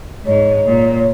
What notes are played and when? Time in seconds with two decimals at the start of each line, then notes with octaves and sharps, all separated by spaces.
0.25 G#2 C#5
0.65 A#2